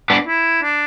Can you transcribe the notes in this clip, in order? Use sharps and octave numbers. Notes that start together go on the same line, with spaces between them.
B3 D4
E4
D4